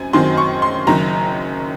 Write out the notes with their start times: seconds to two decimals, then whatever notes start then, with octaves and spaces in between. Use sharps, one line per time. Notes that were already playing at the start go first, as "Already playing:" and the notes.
Already playing: F#2 C4 G#5
0.13 F#2 D#3 F#3 C4 C6
0.37 C#6
0.62 C6
0.87 F#1 F#2 D#3 A#5